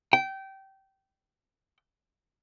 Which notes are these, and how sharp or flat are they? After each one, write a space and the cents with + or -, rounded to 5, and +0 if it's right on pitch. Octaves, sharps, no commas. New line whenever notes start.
G5 -20